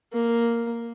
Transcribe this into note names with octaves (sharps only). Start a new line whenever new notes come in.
A#3